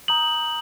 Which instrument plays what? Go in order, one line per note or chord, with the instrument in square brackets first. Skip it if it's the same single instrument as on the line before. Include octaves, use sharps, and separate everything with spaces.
[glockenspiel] A#5 D#6 G6 F#7